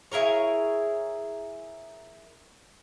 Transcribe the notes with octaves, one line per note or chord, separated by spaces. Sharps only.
E4 G#4 A#4 C#5